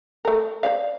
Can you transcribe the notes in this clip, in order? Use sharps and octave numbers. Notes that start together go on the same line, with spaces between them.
A3 A#4
C5 D5 F5